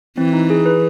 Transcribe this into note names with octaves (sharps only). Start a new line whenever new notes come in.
E3 C4
D#4
G#4
B4